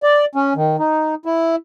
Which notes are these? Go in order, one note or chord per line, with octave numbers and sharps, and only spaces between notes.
D5
C#4
D#3
D#4
E4